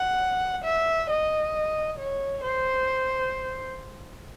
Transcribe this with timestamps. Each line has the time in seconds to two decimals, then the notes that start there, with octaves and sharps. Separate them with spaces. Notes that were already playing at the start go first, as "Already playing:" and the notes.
Already playing: F#5
0.64 E5
1.10 D#5
1.99 C#5
2.44 C5